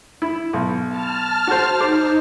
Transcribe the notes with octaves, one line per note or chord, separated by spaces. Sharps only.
E4
B1
A5 F6
F#4 C5
D#4 C5 D6